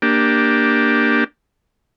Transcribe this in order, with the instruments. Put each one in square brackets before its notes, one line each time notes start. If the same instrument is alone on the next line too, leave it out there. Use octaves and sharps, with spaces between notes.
[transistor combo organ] A#3 D4 G4